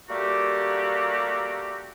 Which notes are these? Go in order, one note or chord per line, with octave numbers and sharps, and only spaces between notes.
G3 A3 A#3 F#4 G4